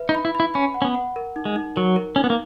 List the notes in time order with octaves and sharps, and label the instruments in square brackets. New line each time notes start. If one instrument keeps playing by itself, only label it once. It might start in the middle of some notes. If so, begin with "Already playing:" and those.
Already playing: [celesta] B4 E5
[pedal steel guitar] D#4
[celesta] B5
[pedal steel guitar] E4
[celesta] B5
[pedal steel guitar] E4
[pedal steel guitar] C#4 [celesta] B5
[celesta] F#5
[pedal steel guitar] C#4
B3
[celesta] F#5
A#4
D#4
[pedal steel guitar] G#3
[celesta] D#4
[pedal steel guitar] F#3 [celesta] A#4
[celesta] A#4
[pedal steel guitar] C#4 [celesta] D#4
[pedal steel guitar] B3
A#3